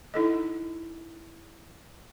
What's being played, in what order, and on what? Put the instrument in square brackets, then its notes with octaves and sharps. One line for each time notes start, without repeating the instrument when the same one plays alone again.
[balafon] D#4 E4 A4 D#5